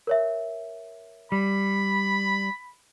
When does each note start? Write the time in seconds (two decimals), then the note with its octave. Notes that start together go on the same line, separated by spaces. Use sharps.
0.07 A#4 C#5 E5
1.32 G3 B5